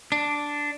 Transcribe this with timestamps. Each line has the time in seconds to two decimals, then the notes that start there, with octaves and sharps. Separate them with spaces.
0.12 D4